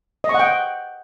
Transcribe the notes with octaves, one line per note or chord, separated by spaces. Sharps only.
D#5
C#6
F#5
G5